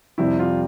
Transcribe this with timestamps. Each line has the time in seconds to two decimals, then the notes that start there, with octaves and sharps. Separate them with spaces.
0.18 F2 C3 G3 C4 E4
0.39 F4